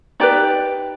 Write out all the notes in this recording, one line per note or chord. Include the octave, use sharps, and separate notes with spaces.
D#4 G4 B4 D5